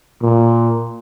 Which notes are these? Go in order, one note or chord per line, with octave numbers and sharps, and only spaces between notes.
A#2